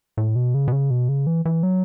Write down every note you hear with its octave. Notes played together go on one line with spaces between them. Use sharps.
A2
B2
C#3
B2
C#3
B2
C#3
E3
E3
F#3